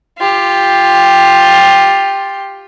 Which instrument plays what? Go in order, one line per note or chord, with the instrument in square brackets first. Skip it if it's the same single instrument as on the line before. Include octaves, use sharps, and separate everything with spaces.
[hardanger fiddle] F4 G4